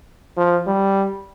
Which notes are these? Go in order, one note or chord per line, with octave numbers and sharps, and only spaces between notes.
F3
G3